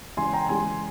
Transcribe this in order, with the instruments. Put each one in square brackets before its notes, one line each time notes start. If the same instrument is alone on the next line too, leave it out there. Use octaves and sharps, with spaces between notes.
[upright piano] C#3 E3 G#3 G#5 C6
G5 A#5
C#3 E3 G#3 G#5 C6